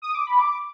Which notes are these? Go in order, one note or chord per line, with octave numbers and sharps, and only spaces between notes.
D#6
D6
B5
D6